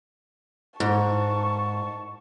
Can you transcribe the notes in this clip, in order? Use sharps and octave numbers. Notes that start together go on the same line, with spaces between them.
G#2 A5 C#6